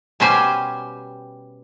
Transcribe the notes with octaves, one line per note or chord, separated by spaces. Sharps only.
B2 G3 C#4 G4 C5 G#5